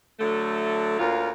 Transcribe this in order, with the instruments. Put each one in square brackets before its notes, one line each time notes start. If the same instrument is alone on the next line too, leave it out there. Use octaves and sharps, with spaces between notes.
[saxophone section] D3 F#3 A3
D2 A#3 C#4 F4